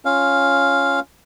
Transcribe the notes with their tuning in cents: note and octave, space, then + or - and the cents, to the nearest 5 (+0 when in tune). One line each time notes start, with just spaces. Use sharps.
C#4 +0 F4 +0 F5 +0